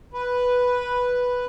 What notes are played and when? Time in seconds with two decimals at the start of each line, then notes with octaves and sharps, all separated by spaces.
0.13 B4